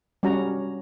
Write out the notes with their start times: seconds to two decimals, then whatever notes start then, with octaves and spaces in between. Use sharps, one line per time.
0.23 G3 C#4 F#4 A#5